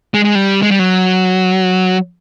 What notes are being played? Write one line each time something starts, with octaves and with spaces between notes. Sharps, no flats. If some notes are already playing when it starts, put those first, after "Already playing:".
G#3
G#3
G3
G#3
G3
F#3